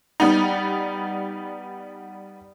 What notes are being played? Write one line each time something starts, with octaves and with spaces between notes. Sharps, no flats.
G3 B3 D#4